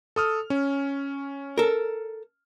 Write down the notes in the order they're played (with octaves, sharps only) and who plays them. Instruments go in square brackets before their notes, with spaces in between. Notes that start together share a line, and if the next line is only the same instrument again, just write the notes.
[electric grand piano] A4 D#6 F6
C#4
[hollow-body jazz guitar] A4 A#4